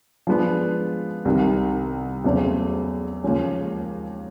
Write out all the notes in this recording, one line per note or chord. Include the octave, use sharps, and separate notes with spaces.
F3 G#3 B3 D4
C2 C3 D#3
E2 C#3 F#3 A3 C4
D#2 C#3 F3 G#3 C#4